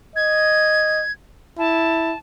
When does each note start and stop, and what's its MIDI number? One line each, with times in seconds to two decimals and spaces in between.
0.16 1.03 75
0.16 1.12 92
1.59 2.14 64
1.59 2.18 81